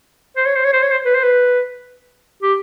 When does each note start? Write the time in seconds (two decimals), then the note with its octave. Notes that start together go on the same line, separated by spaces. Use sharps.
0.37 C5
0.46 C#5
0.56 C5
0.65 C#5
0.73 C5
0.83 C#5
0.92 C5
1.06 B4
1.15 C5
1.24 B4
2.43 G4